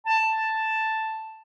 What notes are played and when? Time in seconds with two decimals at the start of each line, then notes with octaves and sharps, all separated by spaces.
0.06 A5